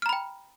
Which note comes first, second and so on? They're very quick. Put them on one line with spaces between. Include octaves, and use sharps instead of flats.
F6 A#5 B5 G5